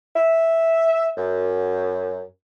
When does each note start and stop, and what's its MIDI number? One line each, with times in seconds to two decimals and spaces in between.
0.16 1.10 76
1.17 2.22 42